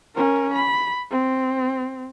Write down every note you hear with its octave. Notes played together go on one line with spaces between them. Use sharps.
C#4 A#4
B5
C4